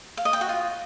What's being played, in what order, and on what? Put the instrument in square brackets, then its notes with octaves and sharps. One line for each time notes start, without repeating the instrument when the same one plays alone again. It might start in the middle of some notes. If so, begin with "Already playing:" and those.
[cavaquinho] F5
D#5
G5
F#4
F4